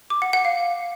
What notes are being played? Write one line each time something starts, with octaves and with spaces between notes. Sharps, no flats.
D6
F#5
F#5
F5